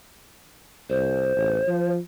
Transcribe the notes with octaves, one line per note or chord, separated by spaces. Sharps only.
C2 C5
A1
F3